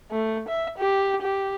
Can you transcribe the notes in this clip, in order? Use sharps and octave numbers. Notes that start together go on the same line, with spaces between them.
A3
E5
G4
G4